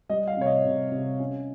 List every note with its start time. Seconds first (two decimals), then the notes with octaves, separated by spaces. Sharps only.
0.09 G3 D#5
0.27 F5
0.37 C3 C#5
0.46 D#5
0.65 C3
0.92 C3
1.20 C#4